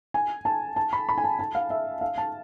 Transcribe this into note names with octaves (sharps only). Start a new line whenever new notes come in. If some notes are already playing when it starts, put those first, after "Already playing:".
G#5
A5
A5
B5
B5
G#5
A5
A5
F5
E5
F5
A5